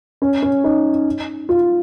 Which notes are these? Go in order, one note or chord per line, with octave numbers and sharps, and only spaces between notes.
C#4
C#4
D#4
F4